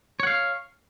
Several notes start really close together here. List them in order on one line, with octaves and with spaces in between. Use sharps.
C#5 F#5 F5